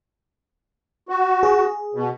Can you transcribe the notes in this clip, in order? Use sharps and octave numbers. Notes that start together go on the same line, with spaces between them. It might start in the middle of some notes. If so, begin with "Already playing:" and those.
F#4
G#4
B2